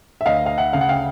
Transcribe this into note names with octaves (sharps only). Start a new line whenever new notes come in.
E5
D2 D#5 F5
F5
E5 F#5
C#3 F5
F#5
F5 G5